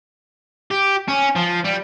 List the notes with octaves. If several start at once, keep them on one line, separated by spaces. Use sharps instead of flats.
G4
C#4
F3
G3